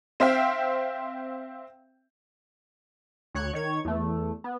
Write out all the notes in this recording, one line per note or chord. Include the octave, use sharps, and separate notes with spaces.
C4 C5 E5 F5 G5
D2 C#5 F#6 G#6 C#7
D#3 C#5 G#6
E2 A3
B3